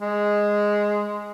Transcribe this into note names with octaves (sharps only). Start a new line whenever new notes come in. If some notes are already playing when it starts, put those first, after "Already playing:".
G#3